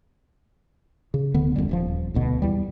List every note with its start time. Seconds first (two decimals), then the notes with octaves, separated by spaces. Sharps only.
1.14 C#3
1.34 D1 D3 B3
1.56 E1 C2 F#2 G3
1.69 D#1 C3 F3
2.14 D1 B1 B2 D3
2.42 E2 G3